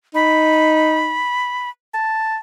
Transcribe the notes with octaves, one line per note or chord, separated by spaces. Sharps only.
D#4 B5
A5